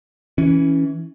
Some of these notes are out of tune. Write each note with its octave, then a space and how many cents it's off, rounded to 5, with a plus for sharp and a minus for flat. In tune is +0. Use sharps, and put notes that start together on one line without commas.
E3 -10 C#4 +0